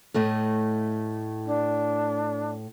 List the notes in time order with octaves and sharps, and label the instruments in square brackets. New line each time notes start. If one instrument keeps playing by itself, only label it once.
[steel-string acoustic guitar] A2 A3 D#5
[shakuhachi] D4